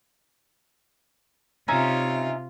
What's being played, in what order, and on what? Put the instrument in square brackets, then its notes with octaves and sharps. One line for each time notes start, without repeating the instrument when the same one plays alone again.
[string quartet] C3 F4 [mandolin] C#4 D#4 E5